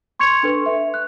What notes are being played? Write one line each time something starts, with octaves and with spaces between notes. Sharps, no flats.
C6 C#6 G#6 C#7 F7
D4 A4 B4
E5
F#6